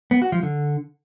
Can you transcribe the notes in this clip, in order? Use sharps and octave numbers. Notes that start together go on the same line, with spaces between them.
B3
F#4
F3
D3